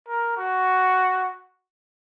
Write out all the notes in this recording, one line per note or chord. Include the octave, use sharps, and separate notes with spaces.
A#4
F#4